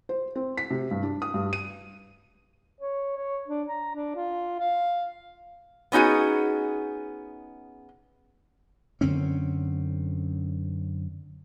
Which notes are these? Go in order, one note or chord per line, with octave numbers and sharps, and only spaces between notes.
C5
C4
B6
C3
G2
D4
D#6
G2
D#7
C#5
C#5
D4
A#5
D4
F4
F5
B3 C#4 D#4 F#4 G#4
F#2 D3 C4 C#4